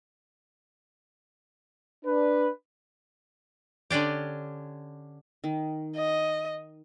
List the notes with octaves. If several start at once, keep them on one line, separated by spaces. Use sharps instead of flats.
D4 B4
D3 C#4 D4 G4
D#3
D#5